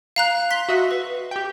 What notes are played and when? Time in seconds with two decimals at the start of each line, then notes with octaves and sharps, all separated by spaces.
0.16 F5 A#5 F#6
0.51 C6 B6
0.69 F#4 D#5 E5
0.91 B4
1.31 G4 G5